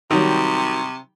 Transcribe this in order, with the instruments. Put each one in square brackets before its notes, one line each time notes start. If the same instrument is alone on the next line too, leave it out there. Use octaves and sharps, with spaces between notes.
[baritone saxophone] C3 [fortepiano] D#3 F#3 G3